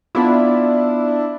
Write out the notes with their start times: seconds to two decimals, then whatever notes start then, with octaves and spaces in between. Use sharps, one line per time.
0.15 B3 D4 E4 F4